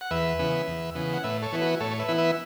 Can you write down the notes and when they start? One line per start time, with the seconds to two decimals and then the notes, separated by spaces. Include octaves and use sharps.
0.01 F#5
0.11 E2 B4 E5
0.39 C#3 E3 B3
0.68 E2
0.95 C#3 E3 B3
1.14 F#5
1.24 A2 B4 E5
1.42 A4 C#5
1.52 E3 B3 E4
1.61 F#4 B4
1.80 A2 A4 C#5
1.91 C#5
1.99 B4 E5
2.08 E3 B3 E4
2.18 B4 E5